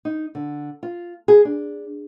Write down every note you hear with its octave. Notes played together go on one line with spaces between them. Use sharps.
D#4
D3
F4
G#4
D4